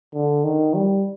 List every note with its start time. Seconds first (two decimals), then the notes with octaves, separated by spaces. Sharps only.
0.14 D3
0.44 D#3
0.75 G3